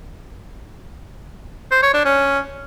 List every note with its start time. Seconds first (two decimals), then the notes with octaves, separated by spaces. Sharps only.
1.71 C5
1.82 C#5
1.94 D4
2.05 C#4